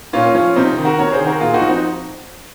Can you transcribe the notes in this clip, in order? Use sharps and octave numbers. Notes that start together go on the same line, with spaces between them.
A#2 C#4 F4
F3 C#4 F4
C3 C4 D#4
D#3
F#4 A#4
C3 A#4 C#5
G#4 C5
D#3
F#4 A#4
A#2 F4 G#4
D#4 F#4
F3
C4 D#4